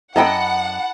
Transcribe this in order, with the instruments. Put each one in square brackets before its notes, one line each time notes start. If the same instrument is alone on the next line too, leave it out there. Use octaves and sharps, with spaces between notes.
[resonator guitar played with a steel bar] F#2 D#5 G5 [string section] F#5 [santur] A5 B5 D6